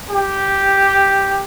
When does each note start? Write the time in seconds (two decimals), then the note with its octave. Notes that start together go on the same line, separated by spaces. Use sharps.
0.11 G4